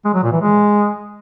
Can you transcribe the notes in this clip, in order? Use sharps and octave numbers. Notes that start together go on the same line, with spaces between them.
G#3
F#3
A#2
E3
G#3